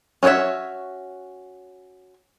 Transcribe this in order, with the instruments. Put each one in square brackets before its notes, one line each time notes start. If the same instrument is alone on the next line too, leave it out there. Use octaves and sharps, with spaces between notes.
[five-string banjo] C#4 F#4 A4 C#5 E5